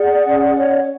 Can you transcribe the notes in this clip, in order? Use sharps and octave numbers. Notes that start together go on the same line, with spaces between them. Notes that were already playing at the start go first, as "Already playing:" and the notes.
Already playing: G#4 D5 F#5
C#4
C#5